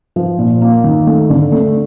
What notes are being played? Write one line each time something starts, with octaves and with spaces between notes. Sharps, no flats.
F3
A#2
A#3
D#3
A3
D3
A3